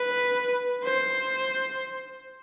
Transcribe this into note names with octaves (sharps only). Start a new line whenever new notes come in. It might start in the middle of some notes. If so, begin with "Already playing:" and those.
Already playing: B4
C5